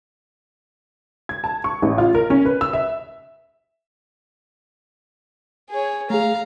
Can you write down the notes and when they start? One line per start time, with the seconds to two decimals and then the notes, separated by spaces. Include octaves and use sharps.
1.29 G#6
1.44 A5
1.64 C#6
1.82 A1
1.98 F4
2.15 A#4
2.30 C#4
2.45 B4
2.61 E6
2.73 E5
5.70 G#4 C#5
6.10 A3 G#4 F5 A#5